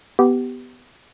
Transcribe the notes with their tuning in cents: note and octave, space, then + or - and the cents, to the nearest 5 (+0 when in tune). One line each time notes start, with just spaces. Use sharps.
B3 +10 G4 -10